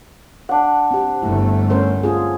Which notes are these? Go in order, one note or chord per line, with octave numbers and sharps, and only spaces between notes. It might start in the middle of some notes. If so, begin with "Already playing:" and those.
D4 F#5
C4 G4
G1 A3 E4
C#4 A#4 C5
C4 F4 G#4